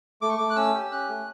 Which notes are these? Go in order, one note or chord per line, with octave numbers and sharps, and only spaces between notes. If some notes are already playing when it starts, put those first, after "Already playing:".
A3 D6
C#6
A3 D6
F#6
C#4 E6
G4
C#4 F#6
A3